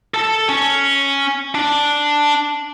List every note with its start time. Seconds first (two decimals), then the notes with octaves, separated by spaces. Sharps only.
0.14 A4 A5
0.49 C#4
1.55 D4